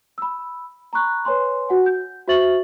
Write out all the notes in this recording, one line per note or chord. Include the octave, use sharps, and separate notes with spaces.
B5 E6
A#5 B5 C#6 F#6
B4 C#5 G#5 C6
F#4 F#5 G#5
G6
F#4 C5 E5 C#6 A6 F#7